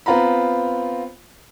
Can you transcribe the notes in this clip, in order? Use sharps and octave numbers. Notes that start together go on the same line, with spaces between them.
B3 C4 F4 A#5 B5